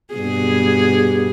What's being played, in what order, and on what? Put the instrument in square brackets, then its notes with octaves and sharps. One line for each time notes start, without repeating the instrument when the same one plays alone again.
[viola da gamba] G2 B2 G#4